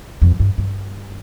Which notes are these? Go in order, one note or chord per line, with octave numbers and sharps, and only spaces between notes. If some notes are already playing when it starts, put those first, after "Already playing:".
F2
G2
G2